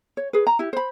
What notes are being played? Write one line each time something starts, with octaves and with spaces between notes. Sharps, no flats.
C#5
G#4 B4
A#5
E4 G4
C5 B5